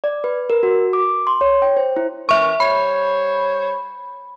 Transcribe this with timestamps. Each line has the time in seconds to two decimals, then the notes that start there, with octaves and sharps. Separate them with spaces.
0.04 D5
0.24 B4
0.50 A#4
0.63 F#4
0.93 D6
1.27 C6
1.41 C#5
1.62 G5
1.77 C5
1.96 E4
2.29 E3 C#4 A#4 E5 C#6
2.60 G3 C5 C#5 B5